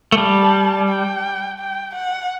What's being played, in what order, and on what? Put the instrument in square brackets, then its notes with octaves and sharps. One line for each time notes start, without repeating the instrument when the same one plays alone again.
[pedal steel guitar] A3
[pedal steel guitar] G3 [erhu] A5
[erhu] G5
G5
F#5